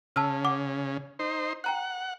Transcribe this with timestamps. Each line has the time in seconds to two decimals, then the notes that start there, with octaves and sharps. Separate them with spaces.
0.16 C#3 A5 E6 F6
0.44 F#5 D6
1.19 D#4 C5
1.64 F#5 G5 A#5 F#6